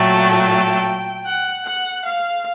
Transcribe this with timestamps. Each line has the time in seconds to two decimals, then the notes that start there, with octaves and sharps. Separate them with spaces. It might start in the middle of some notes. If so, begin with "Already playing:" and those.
Already playing: A#2 F#3 A3 G5
1.25 F#5
1.66 F#5
2.05 F5